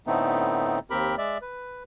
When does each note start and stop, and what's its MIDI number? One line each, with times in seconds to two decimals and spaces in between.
0.07 0.79 45
0.07 0.79 50
0.07 0.79 57
0.07 0.79 59
0.07 0.79 60
0.07 0.79 63
0.90 1.15 39
0.90 1.15 60
0.90 1.15 67
0.90 1.15 70
0.90 1.15 83
1.18 1.38 56
1.18 1.38 74
1.18 1.38 76
1.41 1.83 71